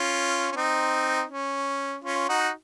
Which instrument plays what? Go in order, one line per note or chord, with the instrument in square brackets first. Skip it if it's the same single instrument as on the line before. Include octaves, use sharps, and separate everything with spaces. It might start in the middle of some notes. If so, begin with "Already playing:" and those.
Already playing: [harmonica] C#4 F4
C#4
C4 D#4
C#4
C#4 F4
D#4 F#4